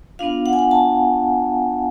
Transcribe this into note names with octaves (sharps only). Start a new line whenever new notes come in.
B3 D4 F4 F5
F#5
G#5
F#5
A5